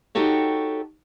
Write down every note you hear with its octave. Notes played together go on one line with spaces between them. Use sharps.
D#4 F#4 G4 A4 C#5